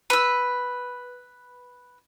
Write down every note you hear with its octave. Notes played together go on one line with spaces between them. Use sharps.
B4 E6